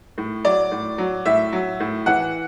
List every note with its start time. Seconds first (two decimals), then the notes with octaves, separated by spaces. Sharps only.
0.18 A2
0.45 F#3 D5
0.72 A2
0.98 F#3
1.25 A2 E5
1.52 F#3
1.80 A2
2.06 E3 F#5